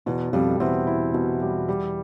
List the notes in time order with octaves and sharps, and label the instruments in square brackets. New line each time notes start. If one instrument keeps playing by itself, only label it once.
[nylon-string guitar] E2 [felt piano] B2
[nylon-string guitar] F2 [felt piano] G3
[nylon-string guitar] E2 [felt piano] C4
[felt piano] E4
B2
G3
G3